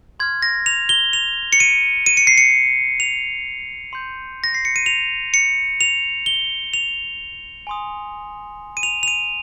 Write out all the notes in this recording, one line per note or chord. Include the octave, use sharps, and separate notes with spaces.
C6 F6 G#6
A#6
F7
G7
F7
C#7
D#7
D#7
C#7
C7
C#7
F7
C6 G6
A#6
C7
C#7
D#7
F7
C#7
F7
G7
F7
G#5 C6 D#6
D#7
F7
F7
D#7